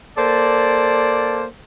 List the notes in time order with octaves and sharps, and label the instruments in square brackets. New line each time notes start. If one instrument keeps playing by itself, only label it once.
[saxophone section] A#3 A4 C5 D5